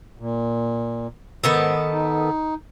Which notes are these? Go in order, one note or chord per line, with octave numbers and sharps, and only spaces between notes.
A#2
G#2 D#3 B3 A4
D#4